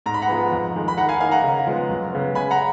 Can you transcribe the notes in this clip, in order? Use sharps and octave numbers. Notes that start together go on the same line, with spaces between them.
G#2 A#5
B5
F#5 A#5
F3 G#3 B3
F2
D#3 G#3
B5
D#3 F#5 A#5
F5 G#5
A#3 D#4 F5 G#5
F#5 A#5
C#3
F3 G#3 B3
F#2
C#3 G#3 B3
C#3 G#5 B5
F#5 A#5